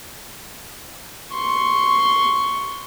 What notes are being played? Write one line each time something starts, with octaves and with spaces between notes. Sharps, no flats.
C6 C#6